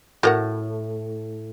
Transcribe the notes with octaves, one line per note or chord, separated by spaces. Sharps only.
A2 F#4 A#4 F#5